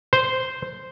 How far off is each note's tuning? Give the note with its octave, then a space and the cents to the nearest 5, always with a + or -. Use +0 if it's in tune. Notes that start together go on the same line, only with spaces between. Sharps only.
C5 -5